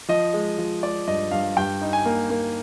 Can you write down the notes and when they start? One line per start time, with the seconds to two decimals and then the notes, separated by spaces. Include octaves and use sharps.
0.09 F3 D#5
0.34 G#3
0.58 F3
0.83 G#3 D5
1.07 G2 D#5
1.31 G2 F5
1.57 G2 G5
1.81 D#4
1.93 G#5
2.05 A#3
2.30 A#3